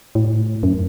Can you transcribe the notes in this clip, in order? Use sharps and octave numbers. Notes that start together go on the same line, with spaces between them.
A2
F#2